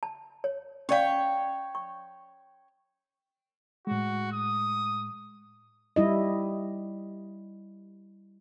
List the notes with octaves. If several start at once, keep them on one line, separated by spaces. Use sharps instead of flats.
A5
C#5
C#4 C#5 D5 F5 G5
C#6
A2 G#3 F#4
D#6
G3 E4 D#5